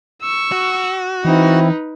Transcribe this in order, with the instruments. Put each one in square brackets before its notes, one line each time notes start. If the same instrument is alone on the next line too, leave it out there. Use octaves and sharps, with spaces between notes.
[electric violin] C#6 E6
[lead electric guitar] F#4
[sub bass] E3 [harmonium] C4 E4 [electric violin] D#4 B4